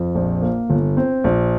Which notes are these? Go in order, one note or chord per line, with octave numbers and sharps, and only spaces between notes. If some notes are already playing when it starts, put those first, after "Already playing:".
Already playing: F2
A#1
A#3
G1
C4
A#1